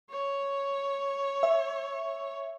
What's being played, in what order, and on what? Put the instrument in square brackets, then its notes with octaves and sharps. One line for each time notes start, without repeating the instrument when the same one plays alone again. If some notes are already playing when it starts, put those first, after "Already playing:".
[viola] C#5
[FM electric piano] E5